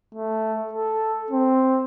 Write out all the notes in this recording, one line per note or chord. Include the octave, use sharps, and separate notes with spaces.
A3
A4
C4